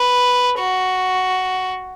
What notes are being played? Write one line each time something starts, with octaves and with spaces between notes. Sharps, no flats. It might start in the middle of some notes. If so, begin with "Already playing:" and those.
Already playing: B4
F#4